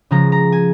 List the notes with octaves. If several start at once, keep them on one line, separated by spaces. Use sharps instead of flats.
C#3 F3 G#3 C#4 A#5
A#5
G#5